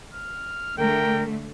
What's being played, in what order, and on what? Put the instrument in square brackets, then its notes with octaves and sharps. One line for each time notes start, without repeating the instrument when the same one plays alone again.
[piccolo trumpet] F6
[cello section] D3 A3 [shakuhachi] A#4 [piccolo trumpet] G5